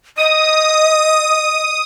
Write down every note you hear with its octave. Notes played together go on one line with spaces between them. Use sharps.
D#5 D#6